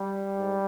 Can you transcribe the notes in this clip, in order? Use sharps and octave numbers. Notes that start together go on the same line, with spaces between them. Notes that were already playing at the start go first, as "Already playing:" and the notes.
Already playing: G3
G#2